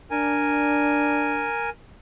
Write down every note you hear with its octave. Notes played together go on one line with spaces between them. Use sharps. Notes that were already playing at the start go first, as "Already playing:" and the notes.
D4 A#4 G#5